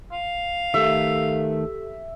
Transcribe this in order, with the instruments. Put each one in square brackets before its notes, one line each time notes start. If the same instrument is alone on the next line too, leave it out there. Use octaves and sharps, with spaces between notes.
[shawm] F5
[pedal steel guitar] D#3 A3 [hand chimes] G4 A4 [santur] E5